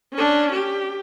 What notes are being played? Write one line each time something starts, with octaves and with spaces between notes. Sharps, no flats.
C#4 D4
G4